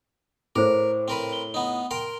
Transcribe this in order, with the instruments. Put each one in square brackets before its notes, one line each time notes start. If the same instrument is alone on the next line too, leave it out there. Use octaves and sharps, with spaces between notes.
[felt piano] A2 [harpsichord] A#4 [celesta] C5 D6
[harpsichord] C4 A#4 B4
[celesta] G7
[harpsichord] B3 D#4
A#4 G5 C6